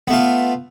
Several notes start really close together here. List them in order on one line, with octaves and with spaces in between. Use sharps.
B3 A3 F4